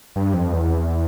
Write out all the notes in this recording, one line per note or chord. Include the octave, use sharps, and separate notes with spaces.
G2
F2
E2